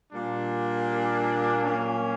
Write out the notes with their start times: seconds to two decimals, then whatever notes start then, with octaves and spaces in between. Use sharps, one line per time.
0.13 A#2 G3 A#3 D4
1.64 A#2 F#3 A#3 C#4